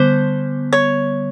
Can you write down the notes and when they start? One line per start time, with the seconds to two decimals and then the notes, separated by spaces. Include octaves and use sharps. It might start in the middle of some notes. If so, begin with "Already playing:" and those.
Already playing: D3 G3 B3 C5
0.73 C#5